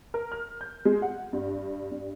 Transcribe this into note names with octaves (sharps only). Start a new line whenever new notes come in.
A#4
F6
G6
G#3
F#5
G2
G2